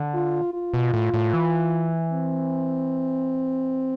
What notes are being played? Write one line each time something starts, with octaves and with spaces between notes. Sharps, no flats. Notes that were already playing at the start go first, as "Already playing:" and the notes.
Already playing: D3
F4
F4
B2
A2
A2
E3
C4